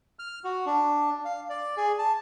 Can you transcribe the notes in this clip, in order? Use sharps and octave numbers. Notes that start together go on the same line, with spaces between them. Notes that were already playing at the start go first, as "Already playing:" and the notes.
F6
F#4
D4
F5
D5
G#4
A5